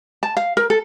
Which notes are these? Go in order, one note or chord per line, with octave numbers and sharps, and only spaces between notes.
A5
F5
A#4
A4